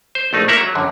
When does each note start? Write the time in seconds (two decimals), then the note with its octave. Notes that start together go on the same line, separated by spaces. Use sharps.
0.15 C5
0.33 A#1 A3 D#4
0.48 A#3 A#4 E5 F#5
0.61 F#3
0.75 F#2 D3